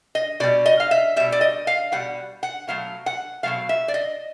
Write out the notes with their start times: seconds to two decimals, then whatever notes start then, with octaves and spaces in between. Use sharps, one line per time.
0.15 D#5
0.40 B2 G3 D5
0.66 D#5
0.80 F5
0.91 E5
1.16 B2 G3 E5
1.32 D5
1.41 D#5
1.67 F5
1.92 B2 G3 F#5
2.43 F#5
2.68 B2 F#3 A3 F5
3.06 F#5
3.43 B2 F#3 A3 F5
3.69 E5
3.88 D5
3.94 D#5